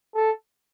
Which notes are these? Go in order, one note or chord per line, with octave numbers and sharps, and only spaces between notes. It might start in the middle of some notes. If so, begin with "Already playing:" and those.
A4